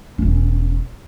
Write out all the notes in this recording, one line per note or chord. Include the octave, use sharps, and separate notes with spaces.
E1 C#4